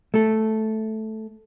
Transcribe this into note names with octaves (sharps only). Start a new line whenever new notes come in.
A3 A4